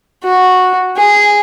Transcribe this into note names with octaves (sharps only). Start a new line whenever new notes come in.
F#4
G#4